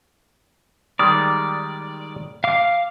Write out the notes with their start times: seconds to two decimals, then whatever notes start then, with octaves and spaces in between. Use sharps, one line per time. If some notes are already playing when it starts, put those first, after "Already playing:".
0.99 D#3 G3 G#3 D5
2.44 F5 D6